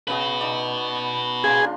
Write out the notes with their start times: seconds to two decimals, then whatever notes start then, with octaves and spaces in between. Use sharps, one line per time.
0.08 C#3 B3 F#4 B4 D#5
0.41 D#4 D5
1.44 C#3 A#3 G#4 C6
1.62 D4 F4